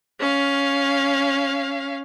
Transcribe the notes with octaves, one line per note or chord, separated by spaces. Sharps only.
C#4 F5